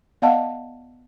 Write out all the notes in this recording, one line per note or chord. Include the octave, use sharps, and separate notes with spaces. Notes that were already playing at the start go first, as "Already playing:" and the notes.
B3 D5 D#5 F5 F#5 A5